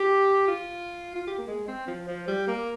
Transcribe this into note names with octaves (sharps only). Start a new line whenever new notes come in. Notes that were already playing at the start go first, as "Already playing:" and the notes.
Already playing: G4
F4
F4
G4
A#3
G#3
C4
F3
F3
G3
A#3